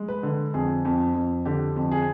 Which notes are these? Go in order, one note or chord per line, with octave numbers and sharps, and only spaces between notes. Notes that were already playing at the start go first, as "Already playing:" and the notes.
Already playing: G#3
B4
D3
F2 G#4
F2
F2
D3 G4
F2
G#4